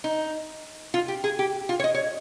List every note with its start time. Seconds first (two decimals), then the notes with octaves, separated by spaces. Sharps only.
0.04 D#4
0.94 F4
1.08 G4
1.24 G#4
1.39 G4
1.69 F4
1.80 C#5
1.84 D#5
1.95 C#5